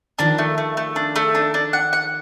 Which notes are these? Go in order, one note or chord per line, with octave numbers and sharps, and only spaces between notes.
D#3 F3 D4
A3
A3
A3
D4
A3
D4
D4
F#5
F#5